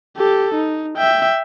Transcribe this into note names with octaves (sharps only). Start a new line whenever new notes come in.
G4 A4
D#4
E5 G5